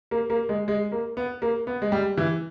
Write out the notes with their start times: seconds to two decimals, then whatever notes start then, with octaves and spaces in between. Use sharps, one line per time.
0.11 A#3
0.30 A#3
0.49 G#3
0.68 G#3
0.92 A#3
1.17 B3
1.42 A#3
1.67 B3
1.82 G#3
1.92 G3
2.18 E3